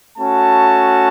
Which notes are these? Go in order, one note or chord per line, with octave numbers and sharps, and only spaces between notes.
A3 C#4 F#4 A5